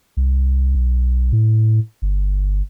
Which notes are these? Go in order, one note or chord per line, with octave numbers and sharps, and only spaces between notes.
C2
B1
A2
G1